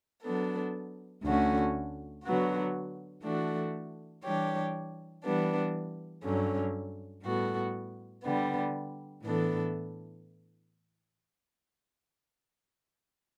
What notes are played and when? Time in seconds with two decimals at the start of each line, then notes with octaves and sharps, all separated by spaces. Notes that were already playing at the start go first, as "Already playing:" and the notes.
0.23 F#3 B3 D4 A4
1.23 D2 D3 A3 C#4 F#4
2.24 D3 F#3 B3 F#4
3.23 E3 A3 D4 F#4 A4
4.24 E3 G3 D4 G4 C#5
5.23 E3 G3 B3 D4
6.23 G2 D3 F#3 C#4
7.23 A2 G3 B3 F#4 A4
8.23 D3 G3 B3
9.22 A2 E3 B3 D4 A4